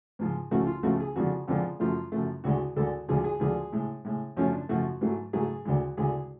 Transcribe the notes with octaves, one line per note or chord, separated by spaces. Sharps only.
G#2 F3 G#3
C#2 C#3 F3 A3 F#4
F4
C#2 C#3 F3 A3 F#4
G#4
F2 D3 F3 G#3 F#4
F2 D3 F3 G#3
F#2 F3 A3 F4
F#2 F3 A3
D2 D3 G#3 F#4
D2 D3 G#3 A4
D2 D3 F3 G#3 G#4
G#4
D2 D3 F3 G#3 G#4
A2 G#3
A2 G#3
F#2 F3 A3 C#4
D4
F#2 F3 A3 F#4
G#2 F#3 A3
G#2 F#3 A3 G#4
D2 D3 G#3
D2 D3 G#3 G#4